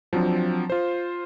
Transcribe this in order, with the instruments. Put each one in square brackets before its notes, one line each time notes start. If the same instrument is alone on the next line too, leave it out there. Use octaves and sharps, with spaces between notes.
[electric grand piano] F3 F#3 C4 D4
F4 C5